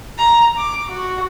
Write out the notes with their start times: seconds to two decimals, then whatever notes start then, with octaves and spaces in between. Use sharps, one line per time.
0.18 A#5
0.57 D6
0.89 F#4